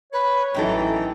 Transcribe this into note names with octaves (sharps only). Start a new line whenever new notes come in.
B4 C#5
A1 F#2 E3 F#3 D#4 A4 G5